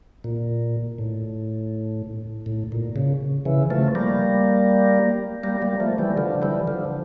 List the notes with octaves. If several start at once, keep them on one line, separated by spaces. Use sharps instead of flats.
A#2
A2
A2
A#2
C#3
C#3 E3
F3 A3
G3 A#3
G3 A#3
G3 A#3
F3 A3
E3 G3
D3 F3
E3 G3
D3 F3